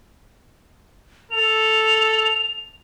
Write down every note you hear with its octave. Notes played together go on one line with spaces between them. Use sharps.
A4 F7